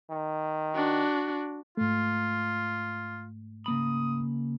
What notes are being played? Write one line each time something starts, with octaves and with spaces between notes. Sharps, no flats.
D#3
D4 F#4
G#2 A3 F4
C#3 A#3 B5 D#6